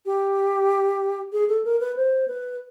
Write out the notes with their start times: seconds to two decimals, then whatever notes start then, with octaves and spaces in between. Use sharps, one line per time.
0.06 G4
1.32 G#4
1.48 A4
1.65 A#4
1.80 B4
1.97 C5
2.28 B4